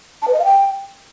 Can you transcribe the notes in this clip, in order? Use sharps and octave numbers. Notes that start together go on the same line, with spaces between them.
A5
B4
D#5
F5
G5